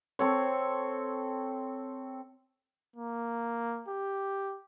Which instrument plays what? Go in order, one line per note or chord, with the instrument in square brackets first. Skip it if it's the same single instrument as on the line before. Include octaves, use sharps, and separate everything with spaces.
[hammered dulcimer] C4 A4 C#5
[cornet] A#3
G4